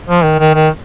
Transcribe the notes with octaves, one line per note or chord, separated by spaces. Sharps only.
F3
D#3
D#3
D#3